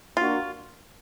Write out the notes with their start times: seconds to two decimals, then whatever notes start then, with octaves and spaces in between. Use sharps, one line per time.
0.17 A#3 D4 F4 F#4 A#4